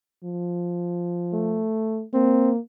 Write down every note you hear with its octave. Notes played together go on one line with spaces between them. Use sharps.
F3
A3
A#3 C4